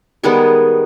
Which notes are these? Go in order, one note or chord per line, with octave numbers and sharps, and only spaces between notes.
D#3 G3 G#3 B3 G#4